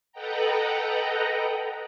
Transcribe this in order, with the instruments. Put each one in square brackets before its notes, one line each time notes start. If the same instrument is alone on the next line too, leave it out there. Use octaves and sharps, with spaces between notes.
[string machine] A4 B4 D#5 F#5 G5 A#5